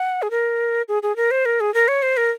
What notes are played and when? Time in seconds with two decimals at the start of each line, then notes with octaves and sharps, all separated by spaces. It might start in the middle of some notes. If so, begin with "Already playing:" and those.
Already playing: F#5
0.22 G#4
0.31 A#4
0.88 G#4
1.03 G#4
1.16 A#4
1.31 C5
1.45 A#4
1.60 G#4
1.74 A#4
1.88 C#5
2.02 C5
2.17 A#4